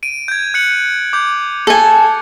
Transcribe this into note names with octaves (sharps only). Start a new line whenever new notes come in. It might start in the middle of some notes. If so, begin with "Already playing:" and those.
D7 D#7
G6 G#6
F#6 C#7 F#7
D6 G6
A4 G#5